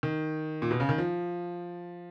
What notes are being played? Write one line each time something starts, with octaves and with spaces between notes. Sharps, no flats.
D#3
A#2
B2
C#3
D#3
F3